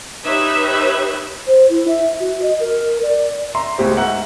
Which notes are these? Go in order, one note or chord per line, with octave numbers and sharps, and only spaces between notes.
D#4 G4 B4 C#5 E5
C5
E4
E5
F#4
D#5
A#4
D5
E5 A#5 C6
C#2 A2 G#3 G4 C5
G#2 E5 F#5 A#5